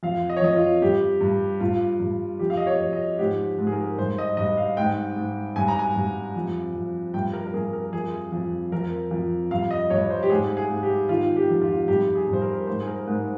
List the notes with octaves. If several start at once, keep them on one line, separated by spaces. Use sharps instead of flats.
F2 F5
D#5
C#5
F2 D#5
F4
G2 G4
G2
G2 F4
G2
F2 G4
F5
D#5
C#5
F2
D#5
G#2 G4
G#2
G#4
A#4
G2 C5
D#5
G2 D#5
F5
G#2 G5
G#2
G2 G#5
A#5
G#5
G2
F2
F2
G2 G5
A#4
A#4
G2 G#4
A#4
F2 G#4
F2
F2 A#4
F2
G2 F5
D#5
G2 C#5
C5
G4
G#2 G#4
G#4
G#2
G4
D#3 F4
G4
F2
F4
G2 G4
G#4
G2 C5
A#4
G#2 C5
G#4
A#4
G#2